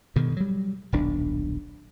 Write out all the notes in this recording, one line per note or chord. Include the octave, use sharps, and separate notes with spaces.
G2 B2 D3 D#3
F#3 G3
D#1 B1 D4